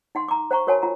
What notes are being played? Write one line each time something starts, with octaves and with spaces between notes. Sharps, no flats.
D#4 F#5 C6
A#5 D6
C5 F#5 A#5 C#6
F#4 A#4 C#5 F#5 G#5 A5
F4 F#5 A#5